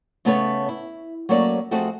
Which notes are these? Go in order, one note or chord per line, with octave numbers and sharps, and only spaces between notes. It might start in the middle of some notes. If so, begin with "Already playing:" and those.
C#3 A3 B3 A4 B4 C#5
E4
F#3 A3 A#3 C#4 C#5 D5
F2 A3 C4 F#4 G#4